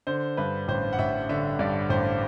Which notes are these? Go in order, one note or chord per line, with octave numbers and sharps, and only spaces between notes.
D3 C5
G2 B4
A1 C5
F#5
A1 E5
D3 E5
G2 D5
A1 C5